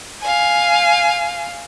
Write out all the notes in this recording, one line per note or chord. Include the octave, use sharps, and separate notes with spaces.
F5 G#5